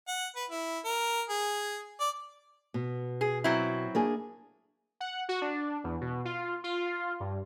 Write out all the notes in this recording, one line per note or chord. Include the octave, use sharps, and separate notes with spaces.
F#5
B4
E4
A#4
G#4
D5
B2
G#4
F#3 C4 E4
A#3 D4 G#4
F#5
F#4
D4
E2
B2
F4
F4
G2